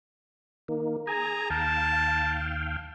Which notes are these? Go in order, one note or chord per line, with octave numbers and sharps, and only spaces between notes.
D#3 A#3
G#4 G#5 A#5
D#2 F5 G5 A5